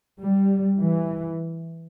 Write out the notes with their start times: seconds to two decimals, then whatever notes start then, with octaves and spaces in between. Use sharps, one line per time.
0.20 G3
0.80 E3